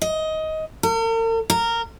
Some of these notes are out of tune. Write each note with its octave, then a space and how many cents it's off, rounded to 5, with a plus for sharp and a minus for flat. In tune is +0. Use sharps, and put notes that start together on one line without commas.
D#5 +15
A#4 -45
A#4 -15